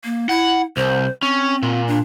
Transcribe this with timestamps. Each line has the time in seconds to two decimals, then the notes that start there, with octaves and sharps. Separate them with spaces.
0.04 A#3
0.29 E4 F#5
0.77 C2 C5
1.22 C4 C#4
1.63 A#2
1.88 D4